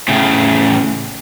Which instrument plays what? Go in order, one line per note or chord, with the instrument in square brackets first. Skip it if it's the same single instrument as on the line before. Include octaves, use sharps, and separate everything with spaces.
[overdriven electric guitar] A2 C#3